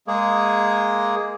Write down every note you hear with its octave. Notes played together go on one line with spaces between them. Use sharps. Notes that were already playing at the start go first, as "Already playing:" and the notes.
G#3 A#3 G#4